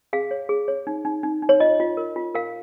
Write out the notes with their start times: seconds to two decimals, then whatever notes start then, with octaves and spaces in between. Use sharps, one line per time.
0.13 G#4 F5
0.31 C#5
0.49 G#4
0.68 C#5
0.87 D#4
1.05 D#4
1.23 D#4
1.42 D#4
1.49 C#5
1.60 F4 D#5
1.80 F4
1.97 A#4
2.16 F4
2.34 A#4 F5